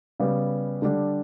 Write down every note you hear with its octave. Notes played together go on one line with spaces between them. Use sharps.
C#3 G3 B3
D3 G3 D4